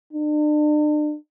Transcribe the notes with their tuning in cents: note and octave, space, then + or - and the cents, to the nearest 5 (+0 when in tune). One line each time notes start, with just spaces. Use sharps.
D4 +40